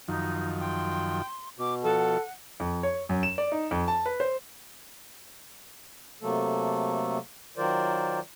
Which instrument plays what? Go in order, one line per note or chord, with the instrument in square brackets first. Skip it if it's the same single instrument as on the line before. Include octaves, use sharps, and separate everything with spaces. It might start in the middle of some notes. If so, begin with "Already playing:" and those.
[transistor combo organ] F#2 D#3 F3 [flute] D#4
[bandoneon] G5 [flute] C6
[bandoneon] B2 [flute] D6
[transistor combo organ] F3 [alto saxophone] A4 [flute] F#5
[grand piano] F2
C#5
F#2
E7
D5
D#4
F2
A5
B4
C5
[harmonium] C3 F#3 A3 A#3 A4
D#3 F#3 F4 A#4 C5 D5